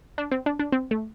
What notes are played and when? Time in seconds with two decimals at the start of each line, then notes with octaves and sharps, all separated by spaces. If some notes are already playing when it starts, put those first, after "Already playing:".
0.18 D4
0.31 C4
0.46 D4
0.59 D4
0.72 C4
0.91 A3